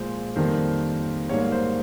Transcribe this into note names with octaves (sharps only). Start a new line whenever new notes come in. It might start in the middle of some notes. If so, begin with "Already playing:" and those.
Already playing: A#2 F3 G#3 C5
F2 D#3 G3 A#3 C5
G#2 G3 A#3 C#5
C5